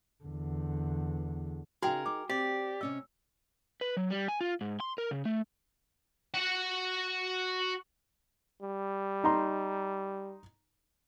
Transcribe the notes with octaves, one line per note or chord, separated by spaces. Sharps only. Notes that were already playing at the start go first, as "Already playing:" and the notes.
E2 D3
C#3 D#4 F#4 G#4 A#4 G5
D#4 D6
C4 G4 D5
C3 C#4 D#5 E6
B4
F#3
G3
G#5
F4
G#2
C6
A#4
C#3
A3
F#4 F#5
G3
D#4 A#5 C6